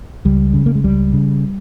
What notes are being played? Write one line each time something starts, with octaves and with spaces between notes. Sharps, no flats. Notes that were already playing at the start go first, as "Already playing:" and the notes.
C#2 G3
C#3
A#3
G#3
C#2 G3
C#3